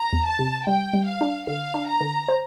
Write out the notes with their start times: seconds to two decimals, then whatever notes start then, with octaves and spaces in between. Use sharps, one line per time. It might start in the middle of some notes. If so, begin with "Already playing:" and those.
Already playing: A#5
0.13 E2
0.26 A5
0.39 C3
0.66 G3 G5
0.93 G3
1.07 F5
1.21 D4
1.47 D3 F5
1.74 D4
1.88 A#5
2.01 D3
2.28 C5